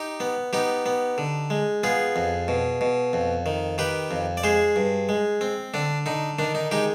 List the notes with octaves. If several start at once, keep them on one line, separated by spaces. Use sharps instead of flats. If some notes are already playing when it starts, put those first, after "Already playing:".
Already playing: D#4 G4
B3
B3 D#4 G4
B3
D3
G#3
B3 F4 G#4
F2
B2
B2
F2
D#3
D#3 G4 B4
F2
D5
G#3 G#4 C5
G2
G#3
C4
D3 D4
D3 D#4
D#3 D4
D#4
G#3 D#4 G4